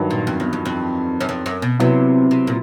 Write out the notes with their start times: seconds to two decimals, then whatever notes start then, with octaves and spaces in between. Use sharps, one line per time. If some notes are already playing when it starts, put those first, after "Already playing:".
Already playing: G2 D#3 F#3
0.10 A#2
0.27 F2
0.40 E2
0.53 F2
0.66 F2
1.20 F#2
1.29 F2
1.46 F#2
1.62 B2
1.79 C3 F#3 B3 E4
2.31 C3
2.47 A#2